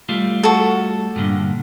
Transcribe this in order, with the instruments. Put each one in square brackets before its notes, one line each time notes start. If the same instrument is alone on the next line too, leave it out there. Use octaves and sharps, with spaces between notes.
[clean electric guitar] G3 A3 F4
[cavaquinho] F#4 A4
[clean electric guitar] G2 A#2 D3